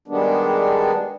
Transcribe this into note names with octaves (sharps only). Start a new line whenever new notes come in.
D#3 G3 G#3 B3 D4